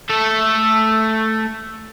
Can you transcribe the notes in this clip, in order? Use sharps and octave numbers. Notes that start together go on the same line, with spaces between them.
A3 A4